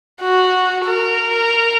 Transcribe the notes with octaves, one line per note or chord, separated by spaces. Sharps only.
F#4
A#4